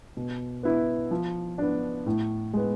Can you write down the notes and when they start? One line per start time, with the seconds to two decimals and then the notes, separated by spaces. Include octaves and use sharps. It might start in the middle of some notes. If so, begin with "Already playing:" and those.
0.17 B2
0.63 B3 E4
1.11 F3
1.58 B3 D4
2.06 A2
2.54 G#3 B3